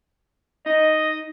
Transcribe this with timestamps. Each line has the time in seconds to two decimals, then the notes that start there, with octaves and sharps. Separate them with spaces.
0.66 D#4 D#5